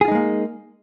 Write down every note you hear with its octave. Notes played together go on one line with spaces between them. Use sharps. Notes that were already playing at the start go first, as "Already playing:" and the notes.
G#3 A#3 D#4 F4 G#4